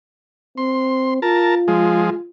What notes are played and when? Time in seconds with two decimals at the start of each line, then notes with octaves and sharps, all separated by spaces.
0.57 C4 C6
1.22 F4 A#4 A5
1.68 F3 G#3